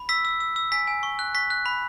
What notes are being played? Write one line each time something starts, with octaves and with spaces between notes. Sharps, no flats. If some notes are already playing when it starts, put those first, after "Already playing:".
Already playing: B5
E6 B6
E6
E6
E6
G#5 B6
G#5
C#6
F#6
C#6 B6
F#6
B5